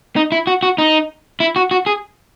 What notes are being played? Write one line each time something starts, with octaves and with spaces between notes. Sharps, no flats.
D#4
E4
F#4
F#4
D#4
E4
F#4
F#4
G#4